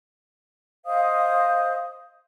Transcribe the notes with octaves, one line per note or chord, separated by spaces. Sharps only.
C5 D#5 F5 D#6